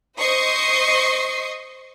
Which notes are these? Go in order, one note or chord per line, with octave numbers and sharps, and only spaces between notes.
C5 D#5 C#6 D#6 C7